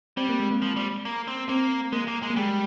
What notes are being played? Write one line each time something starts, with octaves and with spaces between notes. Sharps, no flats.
G3 C4
A#3
G#3
A#3
F3
G3
A#3
C4
A#3 C4
G#3 A#3
A#3
G#3
A#3
G3 G#3